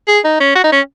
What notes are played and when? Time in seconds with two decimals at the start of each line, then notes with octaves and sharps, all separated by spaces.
0.08 G#4
0.25 D#4
0.41 C#4
0.55 F#4
0.64 D#4
0.72 C#4